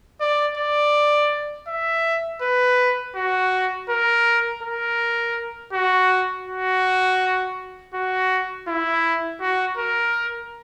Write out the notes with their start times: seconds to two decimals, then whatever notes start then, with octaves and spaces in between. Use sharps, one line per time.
0.21 D5
0.57 D5
1.68 E5
2.42 B4
3.16 F#4
3.89 A#4
4.63 A#4
5.73 F#4
6.47 F#4
7.94 F#4
8.68 E4
9.41 F#4
9.78 A#4